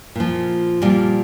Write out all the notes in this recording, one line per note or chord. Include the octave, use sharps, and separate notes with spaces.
A#2 F3
A#2 F3 G3